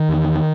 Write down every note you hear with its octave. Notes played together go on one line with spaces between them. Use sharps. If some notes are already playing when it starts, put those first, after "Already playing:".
Already playing: D#3
E2